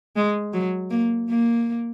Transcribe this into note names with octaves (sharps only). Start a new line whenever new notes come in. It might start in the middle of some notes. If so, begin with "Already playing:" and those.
G#3
F#3
A#3
A#3